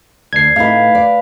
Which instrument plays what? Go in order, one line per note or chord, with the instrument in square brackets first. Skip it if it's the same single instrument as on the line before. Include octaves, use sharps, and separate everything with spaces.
[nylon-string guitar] D2 [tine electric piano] G#6 C7
[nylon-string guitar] A2 A3 D#4 [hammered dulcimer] B4 F5
[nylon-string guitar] D5